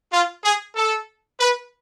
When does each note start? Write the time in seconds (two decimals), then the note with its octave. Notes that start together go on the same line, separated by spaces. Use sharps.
0.11 F4
0.43 G#4
0.76 A4
1.40 B4